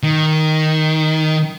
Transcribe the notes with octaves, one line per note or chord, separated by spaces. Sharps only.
D#3